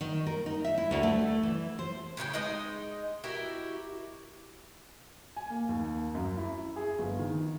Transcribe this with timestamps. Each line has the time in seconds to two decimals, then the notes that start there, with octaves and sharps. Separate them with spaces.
0.01 D#3
0.26 A#4
0.46 D#4
0.65 E5
0.78 E4
0.91 D2
1.03 A3
1.43 E3
1.79 C5
2.17 A2 C#3 G#4 G5
2.34 G#3 D#4 D#5 G5
3.24 E4 F#4 G4 A#4
5.36 G#5
5.50 A#3
5.69 D#2
6.15 F#2
6.37 E4
6.76 G#4
6.99 G1
7.19 D#3